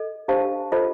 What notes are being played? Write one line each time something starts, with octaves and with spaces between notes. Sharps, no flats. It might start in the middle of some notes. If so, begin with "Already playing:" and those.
Already playing: A4 D#5
D4 G4 C5 F5 A5
F4 A4 C5 D#5 A5